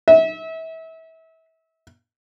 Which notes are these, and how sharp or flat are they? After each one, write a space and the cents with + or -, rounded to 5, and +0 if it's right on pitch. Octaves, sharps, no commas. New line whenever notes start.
E5 -30